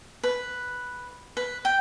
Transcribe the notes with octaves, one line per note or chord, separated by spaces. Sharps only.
B4
B4
G5